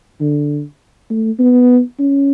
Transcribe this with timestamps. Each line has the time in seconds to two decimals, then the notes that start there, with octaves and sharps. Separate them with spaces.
0.21 D3
1.10 A3
1.39 B3
1.99 C#4